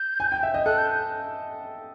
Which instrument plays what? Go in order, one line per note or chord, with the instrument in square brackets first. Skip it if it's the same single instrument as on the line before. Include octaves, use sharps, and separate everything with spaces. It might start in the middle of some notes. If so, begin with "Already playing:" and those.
Already playing: [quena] G6
[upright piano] G#5
G5
E5
D#5
[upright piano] A4 [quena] F#6
[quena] G6